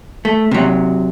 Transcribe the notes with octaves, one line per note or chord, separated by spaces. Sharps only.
A3
C3 F#3